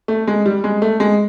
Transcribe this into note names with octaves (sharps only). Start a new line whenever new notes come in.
A3
G#3
G3
G#3
A3
G#3